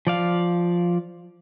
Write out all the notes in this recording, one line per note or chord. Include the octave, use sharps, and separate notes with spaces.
F3 D5 F5